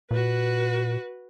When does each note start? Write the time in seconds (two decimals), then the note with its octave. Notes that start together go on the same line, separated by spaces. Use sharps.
0.11 A#2 F#4 B4